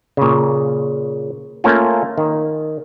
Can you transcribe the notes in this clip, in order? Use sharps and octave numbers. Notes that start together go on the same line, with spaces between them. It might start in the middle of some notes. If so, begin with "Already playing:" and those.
A#2 C#3
A3 A#3 C#4 F4
D#3